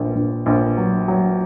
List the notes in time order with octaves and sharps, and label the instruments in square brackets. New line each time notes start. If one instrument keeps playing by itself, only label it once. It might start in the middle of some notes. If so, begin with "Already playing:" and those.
Already playing: [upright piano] A#1
A#1
A#1
F#3
F#3